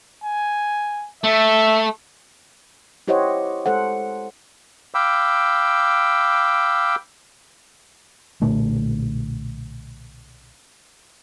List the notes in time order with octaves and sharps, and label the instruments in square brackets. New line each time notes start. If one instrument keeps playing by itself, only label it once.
[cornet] G#5
[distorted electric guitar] A3 [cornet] E5
[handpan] E4 G4 C5 C#5 D#5 F#5
G#3 A4 C5 F#5
[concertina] F5 G5 B5 D6 E6
[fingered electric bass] B1 A#2 D3 A3